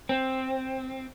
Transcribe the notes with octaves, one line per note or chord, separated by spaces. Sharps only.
C4